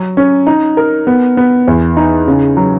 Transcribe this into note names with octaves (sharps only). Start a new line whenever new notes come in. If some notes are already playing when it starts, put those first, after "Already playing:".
Already playing: F#3
C#4
D#4
A#4
B3
B3
E2
D#4
C#3
F#3